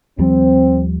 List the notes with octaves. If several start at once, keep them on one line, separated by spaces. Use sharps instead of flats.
D#2 F3 G3 C4